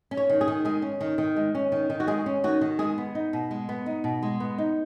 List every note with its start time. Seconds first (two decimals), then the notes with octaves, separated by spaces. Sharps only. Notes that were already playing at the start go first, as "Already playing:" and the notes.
0.11 C#4
0.17 C#5
0.29 D#3
0.41 G#4
0.48 D#3
0.65 G#3 G#4
0.82 C#4
1.01 D#3
1.18 D#3
1.37 G#3
1.55 C#4
1.72 D#3
1.90 D#3
2.00 F#4
2.07 G#3 G#4
2.26 C#4
2.44 D#3 F#4
2.61 D#3
2.79 G#3 G#4
2.98 B3
3.15 D#4
3.33 B2
3.51 G#3
3.69 B3
3.86 D#4
4.04 B2
4.23 G#3
4.40 B3
4.58 D#4